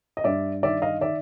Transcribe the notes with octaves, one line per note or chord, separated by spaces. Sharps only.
D#5
G2 D5 E5
D#3 D5 E5
D#5 F5
D#3 D5 E5